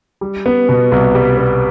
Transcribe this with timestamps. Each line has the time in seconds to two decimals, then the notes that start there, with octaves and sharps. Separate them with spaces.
0.21 G3
0.46 B3
0.69 B2
0.92 C2
1.15 G3
1.38 B3